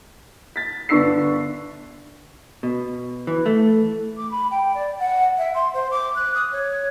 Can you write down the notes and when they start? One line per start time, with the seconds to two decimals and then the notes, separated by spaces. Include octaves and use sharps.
0.56 A6 B6
0.89 G1 B3 D4 C#6 E6 C7
2.63 B2
3.27 E3
3.46 A3
4.16 D6
4.31 B5
4.50 G5
4.74 D5
4.99 F#5
5.38 E5
5.54 C6
5.73 C5
5.90 D6
6.15 F#6
6.34 D#6
6.52 C#5